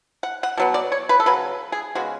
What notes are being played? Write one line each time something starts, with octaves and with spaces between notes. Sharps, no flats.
F#5
F#5
B2 F#3 B3
D5
C#5
B4
A4
C#3 F#3 B4
G#4
C#3 G#3 B3 F#4